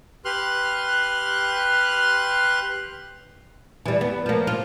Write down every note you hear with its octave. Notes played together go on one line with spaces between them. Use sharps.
G4 B4 C6 F6 F#6
E3 G3
B3
F3 A#3
F4